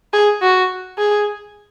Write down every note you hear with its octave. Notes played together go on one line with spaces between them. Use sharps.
G#4
F#4
G#4